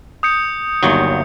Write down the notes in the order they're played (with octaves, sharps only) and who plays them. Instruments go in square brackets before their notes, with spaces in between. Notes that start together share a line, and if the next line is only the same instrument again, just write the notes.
[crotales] D#6 G6 C#7
[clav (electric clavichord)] G1 D#2 F#3